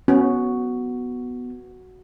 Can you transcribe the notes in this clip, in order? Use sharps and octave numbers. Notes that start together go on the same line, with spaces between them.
B3 C#4 F#4